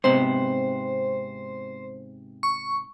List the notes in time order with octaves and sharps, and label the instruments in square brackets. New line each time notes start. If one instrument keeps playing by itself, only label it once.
[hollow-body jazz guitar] G#2 C3 B3 [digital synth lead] C5
[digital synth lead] C#6